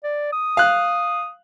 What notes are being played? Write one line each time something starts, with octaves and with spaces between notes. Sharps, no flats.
D5
D#6
F5 F#6